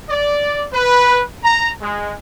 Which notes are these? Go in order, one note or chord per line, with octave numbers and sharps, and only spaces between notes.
D5
B4
A#5
G#3